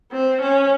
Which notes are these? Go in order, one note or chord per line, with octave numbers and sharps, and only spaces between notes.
C4
C#4